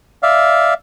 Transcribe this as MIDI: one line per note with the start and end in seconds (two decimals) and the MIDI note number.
0.23 0.74 74
0.23 0.74 76
0.23 0.74 77